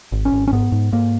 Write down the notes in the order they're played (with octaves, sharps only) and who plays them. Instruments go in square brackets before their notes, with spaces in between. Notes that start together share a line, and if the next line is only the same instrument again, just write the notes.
[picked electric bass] G#1
C#4
G#1
C#4
G#2 B3
G#2
G#2 A#3